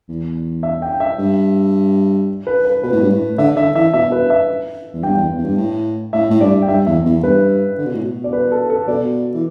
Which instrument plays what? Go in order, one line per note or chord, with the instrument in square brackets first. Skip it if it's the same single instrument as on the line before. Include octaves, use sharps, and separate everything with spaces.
[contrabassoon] E2
[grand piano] E5
G5
E5
[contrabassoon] G2
[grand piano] B4
B4
[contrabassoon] B2 [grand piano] B4
[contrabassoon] A2
G2
A2
[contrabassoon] D3 [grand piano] E5
[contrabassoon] D3 [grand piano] E5
[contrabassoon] E3 [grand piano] E5
[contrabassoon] B2 [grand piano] E5
[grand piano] B4
E5
[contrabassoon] E2
[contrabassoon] G2 [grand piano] G5
[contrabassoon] E2
E2
G2
A2
[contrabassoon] A2 [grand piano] E5
[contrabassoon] A2
[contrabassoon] G2 [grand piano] D5
[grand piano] G5
[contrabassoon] G2 [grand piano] E5
[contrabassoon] E2 [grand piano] E5
[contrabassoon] E2
[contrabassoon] G2 [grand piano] B4
[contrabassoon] D3
B2
A2
B2
[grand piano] D5
B4
A4
A4
[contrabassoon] B2 [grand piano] D5
[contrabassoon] E3